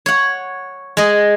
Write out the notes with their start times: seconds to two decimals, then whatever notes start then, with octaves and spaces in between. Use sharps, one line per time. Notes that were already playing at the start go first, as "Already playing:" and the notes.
0.06 C#5 F#5
0.97 G#3 D#5